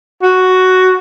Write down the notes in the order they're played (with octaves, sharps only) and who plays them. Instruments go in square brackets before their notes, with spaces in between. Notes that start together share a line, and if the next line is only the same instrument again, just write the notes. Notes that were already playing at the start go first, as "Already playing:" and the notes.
[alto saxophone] F#4